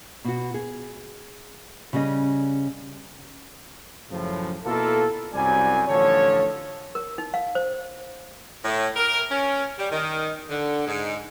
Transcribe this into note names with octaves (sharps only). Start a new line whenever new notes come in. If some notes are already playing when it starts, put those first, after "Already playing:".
B2 F#4
G#4
C#3 G3 C#4 D#5
F#2 A2 C#3 F3
B2 A#3 E4 F4 A4
C2 F#2 F#3 G3 D5 G#5
A1 D3 F3 A4 C#5
A#4
D#4
F5
C5
A2
A#4
C#4
G3
D#3
D3
G#2